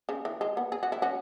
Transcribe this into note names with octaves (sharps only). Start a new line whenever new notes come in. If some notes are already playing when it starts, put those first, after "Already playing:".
C#3
E3
G#3
B3
G#4
F#4
E4
C#4 F#4